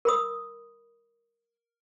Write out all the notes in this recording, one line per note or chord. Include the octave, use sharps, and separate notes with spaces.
A#4 B5 D#6